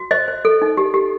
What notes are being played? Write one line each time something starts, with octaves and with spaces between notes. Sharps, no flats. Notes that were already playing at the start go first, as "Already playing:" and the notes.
Already playing: F#4
C5 D#5
C5
A4
D#4
G4
G4